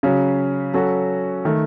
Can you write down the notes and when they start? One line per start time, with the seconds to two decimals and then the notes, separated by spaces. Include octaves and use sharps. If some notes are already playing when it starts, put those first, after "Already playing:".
0.03 C#3 F#3 C#4
0.74 F#3 C#4 F#4 A4
1.45 D#3 A3